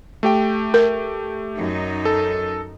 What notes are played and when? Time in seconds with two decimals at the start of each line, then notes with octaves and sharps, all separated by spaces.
0.23 A3 G4 G5
0.74 A#4
1.57 F#2 D#4
2.05 A4